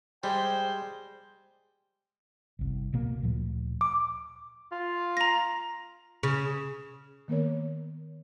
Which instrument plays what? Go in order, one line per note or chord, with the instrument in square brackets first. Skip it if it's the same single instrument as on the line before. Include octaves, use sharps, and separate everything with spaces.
[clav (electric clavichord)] G3 [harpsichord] G#3 [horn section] C5 [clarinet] G5
[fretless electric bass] G1 C2
E1 B2 A#3
D2 A#2 F3
[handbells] D6
[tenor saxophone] F4
[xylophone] A#5 A#6
[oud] C#3
[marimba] D#3 A#3 B3 A#4 C#5